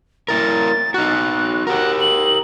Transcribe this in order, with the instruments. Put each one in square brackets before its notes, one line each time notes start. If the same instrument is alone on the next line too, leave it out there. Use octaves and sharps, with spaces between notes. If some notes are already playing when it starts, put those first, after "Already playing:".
[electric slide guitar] A#3 E4 A#4 [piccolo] A6
[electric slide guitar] D#4 F#4 [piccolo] F#6
[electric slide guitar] G4 A#4 [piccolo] F#5
[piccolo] F#7